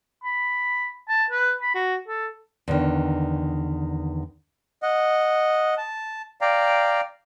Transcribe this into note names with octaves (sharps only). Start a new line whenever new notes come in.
B5
A5
B4
B5
F#4
A4
E2 D3 D#3
D#5 F#5
A5
D5 F5 G5 A#5